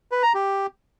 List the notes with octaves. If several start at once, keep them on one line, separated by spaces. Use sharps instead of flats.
B4
A#5
G4